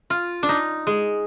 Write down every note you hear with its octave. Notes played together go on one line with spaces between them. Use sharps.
F4
D4
D#4
G#3